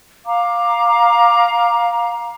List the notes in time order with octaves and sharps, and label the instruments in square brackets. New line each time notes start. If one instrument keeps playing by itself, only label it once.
[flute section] F5 A#5 D6